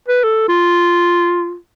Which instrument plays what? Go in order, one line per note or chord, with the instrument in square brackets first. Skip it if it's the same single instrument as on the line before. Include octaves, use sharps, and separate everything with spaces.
[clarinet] B4
A4
F4